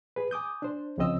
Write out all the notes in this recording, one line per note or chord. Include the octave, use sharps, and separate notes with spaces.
G#4 B4
G#5 D6 D#6 G6
D4 C5
C2 C#3 F3 C4 D#5 E6